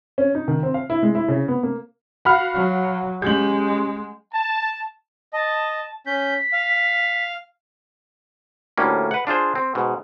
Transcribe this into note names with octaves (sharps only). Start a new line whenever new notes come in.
C#4
D#4
D#3
C4
F5
E4
G#3
E4
C#3
B3
A#3
F#4 F5 F#5 B5 F6
F#3
G#3 C#4 G4 G6 F#7
A5
D#5 A5
C#4 G6 B6
F5
D2 A2 G3 A#3 C#4
B4 F#5
D4 F4 G#4 C5
C4
G#2 B2